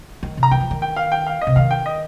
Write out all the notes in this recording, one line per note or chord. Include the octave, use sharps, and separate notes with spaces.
D#3
C3
A#5
D#3 G5
F3
D#3
G5
F5
G5
F5
D#5
C3
D#3 F5
G5
D#5